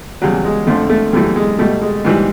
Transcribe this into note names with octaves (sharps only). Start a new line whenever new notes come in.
E2 C#3 F#3 G3
G#3
F2 D3 F3 A3
A3
F#2 C#3 E3 G3 A3
G#3
B2 G3 A3
G#3
G#2 E3 G3